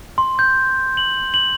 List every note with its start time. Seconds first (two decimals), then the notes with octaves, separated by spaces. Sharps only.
0.18 C6
0.39 G6
0.97 F#7
1.34 F#7